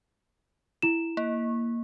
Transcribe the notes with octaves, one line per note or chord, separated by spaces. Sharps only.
E4 E7
A#3